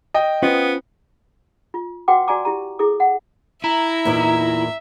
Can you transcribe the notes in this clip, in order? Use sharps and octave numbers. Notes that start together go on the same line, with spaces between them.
D#5 G5
B3 C#4 F4 C5
F4
F#4 B4 F#5 G5 D6
F#4 D5 G#5 A#5 D6
E4 G4 A#5
E4 G#4 A4 D6
F#5
E4 E5 A#5
E2 A#2 D#4